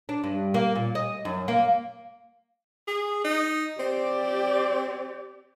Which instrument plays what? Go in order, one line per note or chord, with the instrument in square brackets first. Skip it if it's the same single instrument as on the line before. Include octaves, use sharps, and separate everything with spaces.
[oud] D4
G2
A#3
A#2
D#5
F#2
A#3
[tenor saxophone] G#4
D#4
[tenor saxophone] C4 [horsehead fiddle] G4 D5